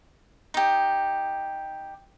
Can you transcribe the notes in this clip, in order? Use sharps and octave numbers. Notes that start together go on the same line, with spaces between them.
D#4 G4